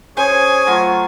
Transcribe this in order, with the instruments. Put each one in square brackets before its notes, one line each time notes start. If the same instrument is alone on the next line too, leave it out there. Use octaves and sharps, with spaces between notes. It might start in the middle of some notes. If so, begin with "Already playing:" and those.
[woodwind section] C#4 G#4 C#5 [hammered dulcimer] C5 [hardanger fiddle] G#5
[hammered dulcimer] F#3 A3 F4